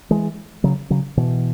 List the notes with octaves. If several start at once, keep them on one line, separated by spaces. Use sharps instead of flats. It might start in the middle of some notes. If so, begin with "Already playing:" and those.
E3 G#3
C#3 F#3
C#3 F#3
B2 E3